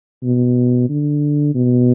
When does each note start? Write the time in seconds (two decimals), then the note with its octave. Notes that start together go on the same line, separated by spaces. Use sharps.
0.23 B2
0.89 D3
1.55 B2